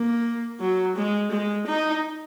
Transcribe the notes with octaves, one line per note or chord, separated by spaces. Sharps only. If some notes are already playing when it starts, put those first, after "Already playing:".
Already playing: A#3
F#3
G#3
G#3
D#4